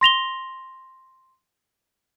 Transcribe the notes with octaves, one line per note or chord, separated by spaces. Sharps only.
C6 A#6 F7 G7